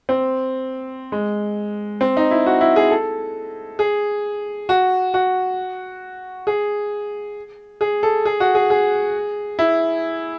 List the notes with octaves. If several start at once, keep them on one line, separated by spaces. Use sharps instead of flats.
C4
G#3
C4
D#4
E4
F#4
E4
G#4
A4
G#4
F#4
F#4
G#4
G#4
A4
G#4
F#4
G#4
G#4
E4